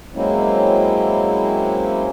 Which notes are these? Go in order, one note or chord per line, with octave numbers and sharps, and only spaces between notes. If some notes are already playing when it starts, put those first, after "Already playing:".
F#3 G#3 A#3 C4 C#4 E4